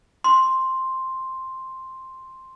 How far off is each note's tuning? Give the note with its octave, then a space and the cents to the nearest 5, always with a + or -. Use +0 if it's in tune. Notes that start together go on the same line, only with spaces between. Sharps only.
C6 +5